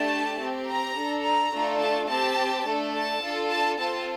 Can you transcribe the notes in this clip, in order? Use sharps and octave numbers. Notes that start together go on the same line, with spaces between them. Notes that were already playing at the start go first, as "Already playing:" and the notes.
Already playing: A3 D4 G4 A5
C4 G4
A#5
D4 A4
A#5
A3 D4 F4 A4
A5
C4 G4 A5
A3 D4 A4
A5
D4 F4 A4
A5
C4 F4 A4 A5